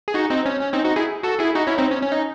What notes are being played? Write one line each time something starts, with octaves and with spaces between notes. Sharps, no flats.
G#4
D#4 F#4
C4 D#4
C#4
C#4
C4 D#4
D#4 F#4
E4 G#4
F#4 A4
E4 G#4
D#4 F#4
C#4 E4
C4 D#4
C#4
C#4
D#4